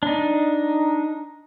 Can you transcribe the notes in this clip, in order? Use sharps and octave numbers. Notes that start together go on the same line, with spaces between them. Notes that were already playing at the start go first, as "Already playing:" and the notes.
D4 D#4